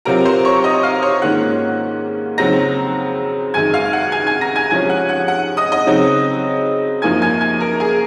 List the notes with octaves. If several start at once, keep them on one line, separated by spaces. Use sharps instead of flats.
C3 F#3 C4 F4 A#4 A#5
C5 C6
C#5 C#6
D#5 D#6
F5 F6
C#5 C#6
G#2 D#3 A#3 C#4 F4 F#5 F#6
F2 C#3 F#3 C4 D#4 A#5 A#6
F#2 D#3 G#3 D#4 G#5 G#6
F5 F6
F#5 F#6
G#5 G#6
G#5 G#6
A#5 A#6
G#5 G#6
C3 F3 G#3 C#4 F4 G#5 G#6
F#5 F#6
F#5 F#6
F#5 F#6
D#5 D#6
D#5 D#6
C#3 F#3 C4 D#4
F#2 F3 A#3 D#4 G#5 G#6
G#5 G#6
G#5 G#6
A#4 A#5
G#4 G#5